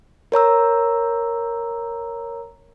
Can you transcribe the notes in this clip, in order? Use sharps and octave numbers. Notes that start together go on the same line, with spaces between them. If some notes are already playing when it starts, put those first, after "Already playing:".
A#4 C#5 A#5 E6